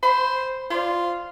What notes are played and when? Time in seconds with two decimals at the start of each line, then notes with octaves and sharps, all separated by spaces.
0.03 C5 B5
0.70 F4 C5 D5